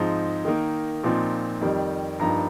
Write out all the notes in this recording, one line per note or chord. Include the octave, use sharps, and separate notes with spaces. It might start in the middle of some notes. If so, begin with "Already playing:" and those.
Already playing: G#2 F3 C4 D#4
D#3 A#3 D#4
A#2 F3 C4 D#4
F2 D#3 G3
G2 F3 A#3 D#4 A#5